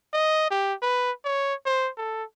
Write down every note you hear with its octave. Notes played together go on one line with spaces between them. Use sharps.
D#5
G4
B4
C#5
C5
A4